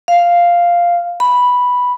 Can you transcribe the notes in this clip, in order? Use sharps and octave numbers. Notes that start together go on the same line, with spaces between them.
F5
B5